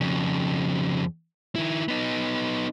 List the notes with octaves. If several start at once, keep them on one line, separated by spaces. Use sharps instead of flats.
F2 C#3
D#3 E4
B3 D#4